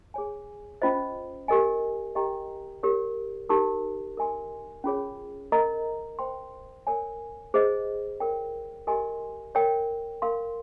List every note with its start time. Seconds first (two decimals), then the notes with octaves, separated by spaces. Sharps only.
0.14 G#4 C#5 G#5
0.82 C#4 F4 C5 D#5
1.48 G4 A#4 D#5 G#5
2.15 G4 A#4 D#5 G5 A#5
2.83 G4 A#4 C#5
3.49 D#4 G4 A#4
4.17 A#4 D#5 G#5 C6
4.84 C#4 F4 G#4 C#5
5.52 A#4 D#5 A#5
6.19 C5 G5 C6
6.87 A#4 C#5 G#5
7.54 G#4 C5 D#5
8.20 A#4 C#5 G5
8.87 G4 A#4 D#5 G#5 C6
9.55 A#4 C#5 G5
10.22 A#4 F5 C6